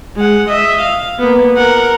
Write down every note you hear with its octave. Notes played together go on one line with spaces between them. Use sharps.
G#3 F#5
D#5 E5
F5
A#3 B3
A#4 F#5